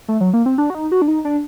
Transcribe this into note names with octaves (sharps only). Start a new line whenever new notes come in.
A3
F#3
A#3
C4
D4
F#4
D#4
F#4
D4
D#4
D4